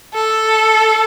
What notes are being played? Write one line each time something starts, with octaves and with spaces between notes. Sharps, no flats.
A4